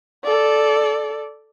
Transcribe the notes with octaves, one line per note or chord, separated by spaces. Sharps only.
A4 D5